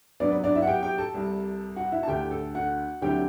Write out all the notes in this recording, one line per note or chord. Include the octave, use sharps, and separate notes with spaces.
C3 F#3 B3 D4 D5
B4
D4 D5
E4 E5
F#5
G4 G5
G4 G5
A4 A5
C2 C3 G3
F#4 F#5
E4 E5
A5
D2 D3 A3 G4 G5
A4
F#4 F#5
D2 D3 F#3 C4 E4 G4 G5